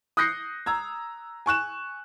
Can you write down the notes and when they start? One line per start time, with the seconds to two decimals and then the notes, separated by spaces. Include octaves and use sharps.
0.17 D#6 F#6 G6 A#6 C7 C#7
0.66 A#5 E6 G#6
1.46 G#5 C#6 F#6 E7